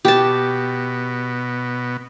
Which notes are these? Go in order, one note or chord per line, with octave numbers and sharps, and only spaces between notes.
B2 G4 A5